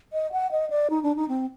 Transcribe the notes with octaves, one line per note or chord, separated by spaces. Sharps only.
D#5
F#5
D#5
D5
D#4
D4
D#4
C4